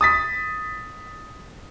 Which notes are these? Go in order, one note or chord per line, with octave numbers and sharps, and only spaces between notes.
D#6 A6 B6